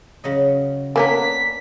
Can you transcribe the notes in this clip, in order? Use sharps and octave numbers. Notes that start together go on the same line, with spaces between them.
C#3 F#3 D#5
A#3 B3 C#4 D4 A#4 B6